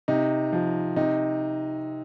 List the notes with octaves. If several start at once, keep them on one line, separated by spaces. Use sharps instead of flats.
C3 D#4
F3
C3 D#4